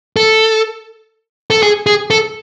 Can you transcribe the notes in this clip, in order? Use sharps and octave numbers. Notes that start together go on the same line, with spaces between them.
A4
A4
G#4
G#4
A4